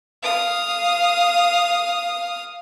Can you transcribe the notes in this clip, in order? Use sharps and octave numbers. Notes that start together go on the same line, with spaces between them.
F5 D#6